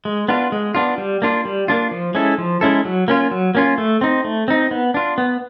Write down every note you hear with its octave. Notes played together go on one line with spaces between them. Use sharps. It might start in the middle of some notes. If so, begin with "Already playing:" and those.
G#3
B3 D4 F4
G#3
B3 D4 F4
G3
A#3 D4 F4
G3
A#3 D4 F4
F3
G#3 C#4 E4 A4
F3
G#3 C#4 E4 A4
F#3
A#3 C#4 F4
F#3
A#3 C#4 F4
A3
C4 D#4
A3
C4 D#4
B3
D4 F4
B3